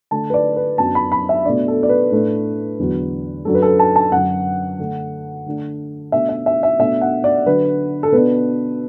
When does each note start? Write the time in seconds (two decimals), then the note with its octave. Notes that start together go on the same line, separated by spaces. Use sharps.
0.11 D3 A3 D4 A5
0.30 B4
0.34 D5
0.56 B4
0.78 F#2 F#3 B3 D4 A5
0.95 B5
1.12 B5
1.29 E5
1.45 B2 A3 D4 D5
1.68 A4
1.83 D5
1.89 B4
2.12 A2 A3 D4
2.79 E2 D3 F#3
3.45 F#2 F#3 D4 A4
3.55 B4
3.62 A4
3.79 A5
3.96 A5
4.12 F#2 D3 F#3 F#5
4.79 D3 A3 D4
5.46 D3 A3 D4
6.12 B2 A3 D4 E5
6.29 E5
6.46 E5
6.63 E5
6.79 B2 A3 D4 E5
7.01 F#5
7.24 D5
7.46 D3 F#3 D4 B4
8.03 A4
8.12 B2 B3 D4 B4